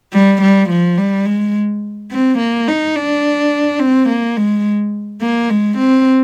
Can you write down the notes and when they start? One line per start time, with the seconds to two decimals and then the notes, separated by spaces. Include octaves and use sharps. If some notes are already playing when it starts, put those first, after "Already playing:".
0.13 G3
0.42 G3
0.70 F3
0.97 G3
1.26 G#3
2.11 C4
2.39 A#3
2.67 D#4
2.96 D4
3.80 C4
4.09 A#3
4.37 G#3
5.21 A#3
5.50 G#3
5.78 C4